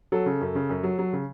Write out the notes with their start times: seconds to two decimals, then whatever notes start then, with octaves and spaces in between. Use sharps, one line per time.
0.12 F#3 A4
0.26 C#3
0.41 F#2
0.55 C#3
0.69 F#2
0.83 F#3
0.99 F#3
1.13 C#3